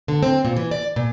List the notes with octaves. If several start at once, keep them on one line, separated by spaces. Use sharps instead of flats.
D3
C4
A#2
E3
D5
A#2